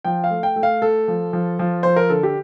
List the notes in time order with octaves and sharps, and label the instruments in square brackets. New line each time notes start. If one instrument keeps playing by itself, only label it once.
[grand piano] F3 G5
F5
A3
G5
A3
F5
A3 A4
F3
F3
F3
F3 C5
A#4
D3 A4
G4